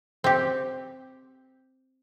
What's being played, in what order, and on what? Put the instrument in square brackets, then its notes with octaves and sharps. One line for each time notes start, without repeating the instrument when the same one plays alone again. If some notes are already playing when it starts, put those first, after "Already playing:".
[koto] C4 G4